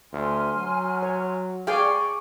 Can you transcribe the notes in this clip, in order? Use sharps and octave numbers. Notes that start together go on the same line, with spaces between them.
D2 G#5 C6 F6
F#3
C#5
G#4 D5 F5 G5 G#5 C#6